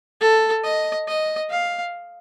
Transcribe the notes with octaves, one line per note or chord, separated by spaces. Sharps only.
A4
D#5
D#5
F5